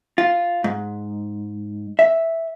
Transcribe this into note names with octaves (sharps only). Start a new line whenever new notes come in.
F4
G#2
E5